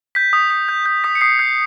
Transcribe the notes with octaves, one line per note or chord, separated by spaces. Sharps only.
G6 B6
D#6
D#6
G6
G6
D#6 B6
C#7
D#6 C7
G6 C7